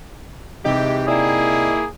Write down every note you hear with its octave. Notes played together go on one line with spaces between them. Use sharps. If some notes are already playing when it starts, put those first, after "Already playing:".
C3 E3 G#3 D#4 G4
A#3 E4 G#4 D5 D#5 G5